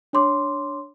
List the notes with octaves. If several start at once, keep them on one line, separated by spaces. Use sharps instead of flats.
D4 C#5 C6 D6